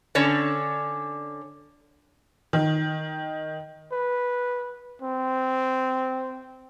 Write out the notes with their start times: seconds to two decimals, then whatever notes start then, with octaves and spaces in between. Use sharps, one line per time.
0.15 D3 C#4 C#5 D5
2.53 D#3
3.92 B4
5.02 C4